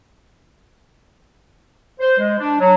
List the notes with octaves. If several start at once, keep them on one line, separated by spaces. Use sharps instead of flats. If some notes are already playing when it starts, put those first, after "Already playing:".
C5
G#3
D4
F#3